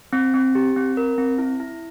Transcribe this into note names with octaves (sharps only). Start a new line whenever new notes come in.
C4
C4
G4
C4
A#4
C4
E4
E4